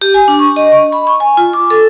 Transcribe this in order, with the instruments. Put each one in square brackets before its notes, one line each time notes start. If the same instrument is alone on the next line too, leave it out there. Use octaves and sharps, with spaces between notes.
[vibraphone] G4
G#5
D4
C#6
D#5
C#6
B5
C#6
G#5
F4
D6
A4